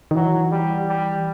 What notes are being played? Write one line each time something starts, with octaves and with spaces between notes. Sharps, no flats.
D#3
E3 F#3
G3
G3